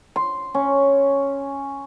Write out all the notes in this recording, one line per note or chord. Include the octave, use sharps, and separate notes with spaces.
C6
C#4